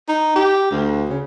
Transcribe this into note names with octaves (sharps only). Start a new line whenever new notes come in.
D#4
G4
D2
C#3